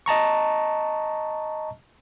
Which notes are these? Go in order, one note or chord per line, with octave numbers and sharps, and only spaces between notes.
D#5 A5 A#5 C#6